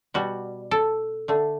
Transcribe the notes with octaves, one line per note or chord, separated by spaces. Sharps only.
B2 G3 F#4
A4
D3 A3